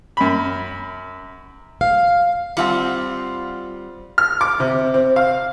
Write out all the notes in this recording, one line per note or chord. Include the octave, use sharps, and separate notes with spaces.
F#2 B5
F5
G3 C4 F4 F5 F#5
F6
D6
C3
C4
F5